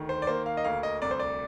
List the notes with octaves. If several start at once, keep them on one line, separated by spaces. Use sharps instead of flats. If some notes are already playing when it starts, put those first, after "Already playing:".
Already playing: D2 D#3
C5
D5
A#3 C5
F5
D#5
D2 F5
D#5
C2 D5
C5
D5